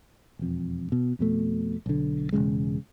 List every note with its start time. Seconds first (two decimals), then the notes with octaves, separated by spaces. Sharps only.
0.39 E1 F2
0.92 B2
1.19 F2 B2 A3
1.86 B1 D3
2.33 E1 D#2 C#3 G#3